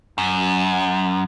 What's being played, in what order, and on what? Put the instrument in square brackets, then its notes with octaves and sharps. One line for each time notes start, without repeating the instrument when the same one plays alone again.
[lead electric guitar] F#2